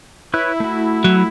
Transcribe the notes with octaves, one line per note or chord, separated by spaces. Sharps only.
E4 B4 C#5 F#6
A3 F#4
F#3